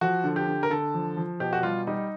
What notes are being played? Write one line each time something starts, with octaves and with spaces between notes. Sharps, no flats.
F3 F#4
D3
G4
D3
A#4
D3 A4
F3
F3
B2 G4
F#4
G3 F4
G3 D#4